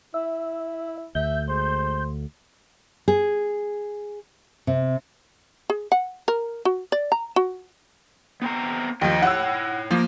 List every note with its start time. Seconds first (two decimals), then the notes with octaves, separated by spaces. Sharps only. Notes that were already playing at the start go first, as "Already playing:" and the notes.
0.14 E4 E5
1.15 D2 E5 G6
1.49 G#3 C5
3.08 G#4
4.67 C3
5.70 G#4
5.92 F#5
6.28 A#4
6.65 F#4
6.92 D5
7.12 A#5
7.36 F#4
8.42 B3 C4 A#5
9.02 D#2 F3 D#5 G5
9.22 E4 C#5 F#5 E6
9.91 F3 A#3